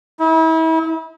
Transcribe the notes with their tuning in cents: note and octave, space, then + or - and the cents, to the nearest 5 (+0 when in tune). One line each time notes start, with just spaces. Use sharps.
E4 -35